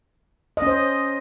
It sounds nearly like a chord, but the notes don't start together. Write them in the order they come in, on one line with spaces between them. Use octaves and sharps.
D#5 C#4 C5